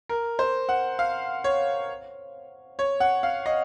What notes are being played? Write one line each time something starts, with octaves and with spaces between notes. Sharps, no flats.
A#4
C5
F#5
F5
C#5
C#5
F#5
F5
D#5